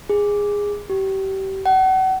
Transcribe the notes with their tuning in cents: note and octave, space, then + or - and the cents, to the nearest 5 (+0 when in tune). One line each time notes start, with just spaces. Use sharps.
G#4 -15
G4 -30
F#5 +35